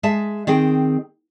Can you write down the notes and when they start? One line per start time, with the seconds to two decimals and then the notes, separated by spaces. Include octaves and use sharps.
0.03 G#3 G#4 E5 A5
0.47 D#3 C4 G#4 G5